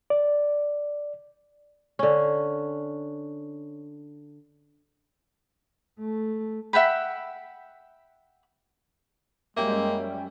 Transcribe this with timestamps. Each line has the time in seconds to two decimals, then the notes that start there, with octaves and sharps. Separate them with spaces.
0.10 D5
1.99 D3 C#4
5.99 A3
6.73 E5 F#5 G5 B5
9.57 F#2 G3 G#3 A#3 C#4 E5 G5